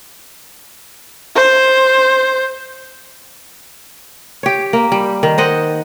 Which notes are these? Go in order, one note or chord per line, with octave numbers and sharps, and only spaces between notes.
C5
G4 C#5
A#3
G3
D#3
C5 D#5 F#5